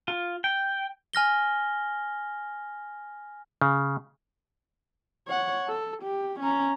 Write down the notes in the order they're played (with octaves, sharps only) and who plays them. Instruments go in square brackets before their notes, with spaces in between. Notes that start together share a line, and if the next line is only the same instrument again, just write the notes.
[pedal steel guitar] F4
G5
[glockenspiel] G#5 F6 A#6 G7
[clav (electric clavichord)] C#3
[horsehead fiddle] C#5 F#5
A4
G4
C#4 A#5